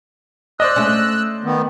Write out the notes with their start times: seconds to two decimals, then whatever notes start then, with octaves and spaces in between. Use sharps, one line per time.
0.60 C5 D5 D#5 E6 F#6
0.76 A3 C#4
1.44 D#3 B3